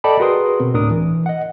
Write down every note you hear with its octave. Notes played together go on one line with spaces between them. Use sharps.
A4 D5 D#5 G5 A5 B5
F#4 G#4 A#4 B4 C6 D#6
B2 C4
D2 A2 D4 A#4 D#6
E3
D#5 F#5